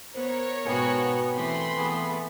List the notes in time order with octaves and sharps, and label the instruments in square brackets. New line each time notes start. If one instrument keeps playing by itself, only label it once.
[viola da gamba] B3 [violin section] A#4 C#5 [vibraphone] C5
[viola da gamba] G#2 B2 F#4 [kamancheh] B3 [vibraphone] B4 G5 G#5
[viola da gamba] E3 A3 C4 [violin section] B5 C6
[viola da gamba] E3 A3 [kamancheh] B3 G#4